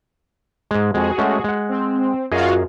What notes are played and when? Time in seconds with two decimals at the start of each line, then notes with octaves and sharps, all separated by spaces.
0.71 G#2 G#3
0.94 F2 G#3 F#4 G#4
1.18 G#3 A3 C#4
1.44 G#3 F#5
1.69 C4
2.32 F#2 F4 F#4 G#4 D#5 F5